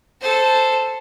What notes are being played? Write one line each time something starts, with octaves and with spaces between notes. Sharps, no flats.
A4 C5